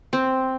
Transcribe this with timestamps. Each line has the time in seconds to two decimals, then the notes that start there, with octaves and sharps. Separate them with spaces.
0.13 C4